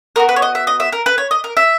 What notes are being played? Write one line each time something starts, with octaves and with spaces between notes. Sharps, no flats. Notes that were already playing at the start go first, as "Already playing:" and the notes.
B3 F#4 A#4
B4
C#5
D#5
E5
D#5
E5
A#4
B4
C#5
D#5
A#4
E5